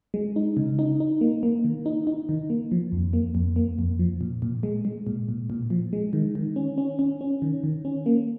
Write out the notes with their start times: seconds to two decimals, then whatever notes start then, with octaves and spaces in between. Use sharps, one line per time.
0.14 G#3
0.36 D#4
0.57 C#3
0.79 D#4
1.00 D#4
1.21 A#3
1.43 A#3
1.65 D#3
1.86 D#4
2.07 D#4
2.29 D#3
2.50 A#3
2.72 F3
2.92 F2
3.13 A#3
3.35 F2
3.56 A#3
3.79 F2
3.99 F3
4.21 A#2
4.42 A#2
4.63 G#3
4.85 G#3
5.07 A#2
5.29 A#2
5.50 A#2
5.70 F3
5.93 G#3
6.13 D#3
6.35 D#3
6.56 C#4
6.78 C#4
6.99 C#4
7.21 C#4
7.42 D#3
7.64 D#3
7.85 C#4
8.06 A#3